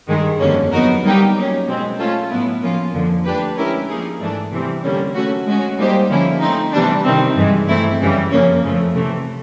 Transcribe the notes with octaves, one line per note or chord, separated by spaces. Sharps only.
G2 D#3 G#3
F2 D3 G3 A#3 C#4
F#3 B3 D#4 F#4 A#4
G3 A#3 D#4 G4
F#3 A#3 C#4
B2 G#3 C4
A3 C#4 F4 A4
A2 F#3 B3 E4
F3 A#3 C#4 F4
F2 D3 F3 A#3
A3 D4 G4 B4
G#3 C#4 E4 G4 A#4
F3 A#3 D#4 G#4
G#2 E3 A3 D4
C3 E3 G3 C4
D3 G3 A#3 C#4
F#3 A3 C#4 F#4
G#3 C#4 F#4
G3 A#3 D#4 G4 C5
D3 F3 A#3 C#4 E4
A3 C4 D#4
C3 E3 G3 B3 D4
C3 D#3 G3 C4
G2 E3 G#3
E3 A3 C4 E4
F#2 C#3 E3 G3
F2 C#3 F3 A#3 C#4
F2 C#3 F3 A3
C3 E3 A3